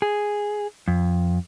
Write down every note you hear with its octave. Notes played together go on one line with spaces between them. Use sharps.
G#4
F2